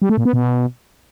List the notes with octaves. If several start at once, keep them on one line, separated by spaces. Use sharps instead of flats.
G3
A3
A#2
B3
B2